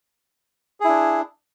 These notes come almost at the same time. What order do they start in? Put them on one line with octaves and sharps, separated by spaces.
G#4 E4 D4